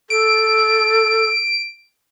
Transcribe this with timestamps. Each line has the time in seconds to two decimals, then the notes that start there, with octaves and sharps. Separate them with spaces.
0.10 A4 D7